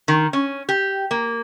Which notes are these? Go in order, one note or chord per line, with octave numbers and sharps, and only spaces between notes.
D#3
C#4
G4
A#3